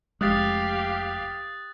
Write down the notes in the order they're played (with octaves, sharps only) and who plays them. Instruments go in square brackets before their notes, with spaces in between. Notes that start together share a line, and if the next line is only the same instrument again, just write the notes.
[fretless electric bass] F1 G#3 [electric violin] G4 F5 [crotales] D#6 F#6 A6